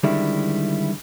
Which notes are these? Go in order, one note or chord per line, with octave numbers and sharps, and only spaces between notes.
D3 D#3 G3 G#3 C4 E4